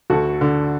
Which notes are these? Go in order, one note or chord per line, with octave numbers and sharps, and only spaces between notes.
D2 F#4 A4
D3